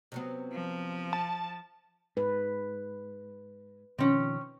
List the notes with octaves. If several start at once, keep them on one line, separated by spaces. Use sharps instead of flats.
C3 F#3 B3
F3
A5
G#2 B4
B2 D#3 F3 C4 C#4